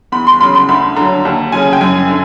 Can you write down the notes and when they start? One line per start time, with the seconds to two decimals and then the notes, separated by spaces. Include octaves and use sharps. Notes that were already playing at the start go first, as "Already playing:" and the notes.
0.12 E2 B5
0.27 C6
0.41 C#3 F#3 B5
0.55 C6
0.69 D2 B5
0.96 D3 F#3 A#5
1.25 D#2 A5
1.52 C#3 F#3 G#5
1.73 G5
1.81 F#2 G#5
2.09 D3